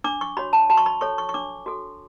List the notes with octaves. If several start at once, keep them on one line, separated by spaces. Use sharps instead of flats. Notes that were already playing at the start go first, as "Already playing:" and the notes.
D4 D6
C#6
F#4 C#5 B5
A5
F#4 A5
C#6
B5
A4 C#5 C#6
C#6
C#6
D4 D6
F#4 A4